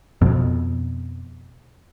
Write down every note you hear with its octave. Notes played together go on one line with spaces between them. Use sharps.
F2 B2